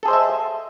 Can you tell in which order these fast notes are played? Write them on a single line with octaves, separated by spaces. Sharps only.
A4 G#4 C5 D#5 E5